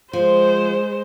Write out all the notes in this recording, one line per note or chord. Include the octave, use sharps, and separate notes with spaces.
F3 G#3 C5